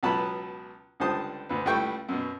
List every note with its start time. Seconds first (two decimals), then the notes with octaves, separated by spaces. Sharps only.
0.03 C#2 B2 F#3 B3 A5 B5
1.00 C#2 D3 G3 C5 A5 D#6
1.49 D2 B4
1.66 C#2 G3 A3 E4 G5 C#6
2.09 F#2 B2